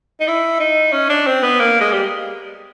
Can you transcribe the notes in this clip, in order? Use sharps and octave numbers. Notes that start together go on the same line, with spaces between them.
D#4
E4
D#4
C#4
D4
C4
B3
A#3
G#3
G3